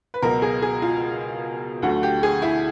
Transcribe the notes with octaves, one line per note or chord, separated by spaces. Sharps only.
B4
C#2 B2 F#3 A#4
G#4
G#4
F4
D2 D3 F#3 A3 F#4
G4
G#4
E4